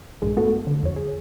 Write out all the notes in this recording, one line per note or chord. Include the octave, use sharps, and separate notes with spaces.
A#1 G2 G#3
A3 B3 F#4 A4
D3
F2 C#5
G#4